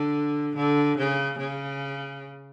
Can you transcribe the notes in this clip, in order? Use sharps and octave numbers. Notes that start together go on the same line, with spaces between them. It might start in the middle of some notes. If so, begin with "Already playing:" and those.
Already playing: D3
D3
C#3
C#3